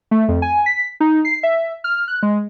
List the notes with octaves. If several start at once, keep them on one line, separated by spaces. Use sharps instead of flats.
A3
F2
G#5
B6
D#4
C7
E5
F6
F#6
G#3